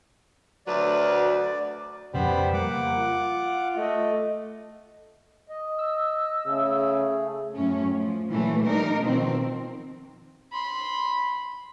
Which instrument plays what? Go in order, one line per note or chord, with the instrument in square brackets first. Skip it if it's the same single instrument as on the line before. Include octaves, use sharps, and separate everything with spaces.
[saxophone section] D2 F#3 B4 [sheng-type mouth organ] D5
[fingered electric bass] F2 C#3 [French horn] G3 [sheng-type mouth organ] B3 C5 B5
[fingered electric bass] G3 [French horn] A#3 [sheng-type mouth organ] F#5 D6
[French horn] F4
[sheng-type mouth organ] A3 [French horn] D#5
[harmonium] D#5
[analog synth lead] E6
[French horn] C#3 [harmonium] A3 G#4
[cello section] F#2 A2 C#4
F3
A#2 E3 F#3 A3
G3 D4 D#4 A#4
B2 D#3 F3 C4
[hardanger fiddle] B5 C6